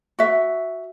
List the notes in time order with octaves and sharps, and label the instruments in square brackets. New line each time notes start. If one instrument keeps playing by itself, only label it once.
[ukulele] F#4 E5